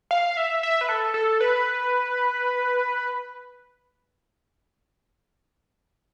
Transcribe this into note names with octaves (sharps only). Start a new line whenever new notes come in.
F5
E5
E5
B4
A4
A4
B4